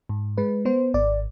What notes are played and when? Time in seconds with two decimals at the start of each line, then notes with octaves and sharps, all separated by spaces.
0.09 G#2
0.38 G#3 B4
0.65 B3 C5
0.94 G#1 D5